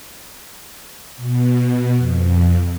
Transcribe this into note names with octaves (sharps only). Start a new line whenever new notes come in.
B2
F2